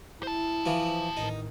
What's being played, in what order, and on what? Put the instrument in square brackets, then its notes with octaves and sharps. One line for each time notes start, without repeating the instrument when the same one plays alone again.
[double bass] E4 [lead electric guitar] C5 A5
[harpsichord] E3 F3 F4
[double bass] A1 D#3 [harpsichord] D#4